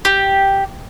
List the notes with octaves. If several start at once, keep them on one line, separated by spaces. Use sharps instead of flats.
G4